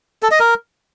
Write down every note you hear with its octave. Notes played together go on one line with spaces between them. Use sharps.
A4
D#5
A#4